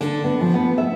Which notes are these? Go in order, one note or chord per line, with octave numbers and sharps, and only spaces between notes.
D3
B3
F3
B3
E5